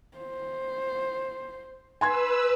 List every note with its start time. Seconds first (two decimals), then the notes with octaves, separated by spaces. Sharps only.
0.18 C5
2.01 B4 G#5 C6 E6 G#6